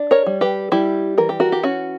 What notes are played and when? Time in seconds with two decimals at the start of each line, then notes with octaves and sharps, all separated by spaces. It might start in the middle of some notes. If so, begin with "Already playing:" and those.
Already playing: D4
0.11 A#4 C#5
0.26 G3
0.41 G4 B4
0.72 G3 E4 G4
1.18 E3 A#4
1.29 G4
1.40 F#4 A#4
1.52 G4
1.63 C#4 F#4